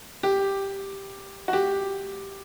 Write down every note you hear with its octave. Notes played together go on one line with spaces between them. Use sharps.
G4
F#4
G4